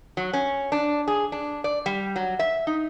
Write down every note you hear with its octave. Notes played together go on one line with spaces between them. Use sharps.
F#3
C#4
D4
G#4
D4
D5
G3
F#3
E5
D#4